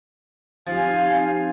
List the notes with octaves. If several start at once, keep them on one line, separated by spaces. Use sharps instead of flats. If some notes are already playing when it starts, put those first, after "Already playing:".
F3 C4 D#4 G4 F5 G#5